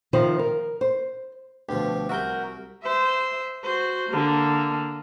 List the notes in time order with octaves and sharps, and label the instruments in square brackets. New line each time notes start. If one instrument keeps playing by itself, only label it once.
[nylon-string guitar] C3 D#3 F3 C5
A#4
C5
[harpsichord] D2 B2 F3 [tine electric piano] G4
[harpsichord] C2 E5 [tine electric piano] F#4 A#4 G6
[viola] C5 E5
F#4 C5
D3 A#3